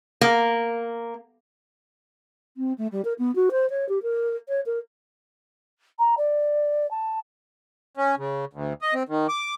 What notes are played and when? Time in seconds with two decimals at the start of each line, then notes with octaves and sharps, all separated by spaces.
0.21 A#3
2.57 C4
2.78 A3
2.92 G3
3.04 A#4
3.19 B3
3.35 F#4
3.51 C5
3.70 C#5
3.89 G4
4.02 A#4
4.48 C#5
4.66 A#4
5.99 A#5
6.18 D5
6.91 A5
7.97 C#4
8.18 C#3
8.53 D2
8.82 D#5
8.94 C4
9.09 D#3
9.29 D6